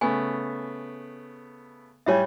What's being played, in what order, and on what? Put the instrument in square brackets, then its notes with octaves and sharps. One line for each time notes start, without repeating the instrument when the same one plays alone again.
[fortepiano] C#3 A3 B3 [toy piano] G#5
[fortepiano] A2 G3 G#5 [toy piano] C#5 E5